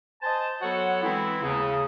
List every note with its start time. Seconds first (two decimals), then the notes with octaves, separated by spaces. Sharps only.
0.22 C5 D#5 G#5 A5
0.62 F#3 B3 F#4 A4 C#5 F#5
1.03 E3 G#3 B3 C4 E4
1.42 D#2 C#3